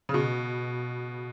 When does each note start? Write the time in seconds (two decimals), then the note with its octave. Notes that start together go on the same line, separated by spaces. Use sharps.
0.09 C#3
0.14 B2